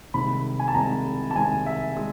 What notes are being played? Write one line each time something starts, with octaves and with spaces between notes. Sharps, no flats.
C2 C3 D#3 G#3 B5
G#5
A5
C2 C3 D#3 G#3 A#5
A5
C2 C3 D#3 G#3 G#5
E5
G#3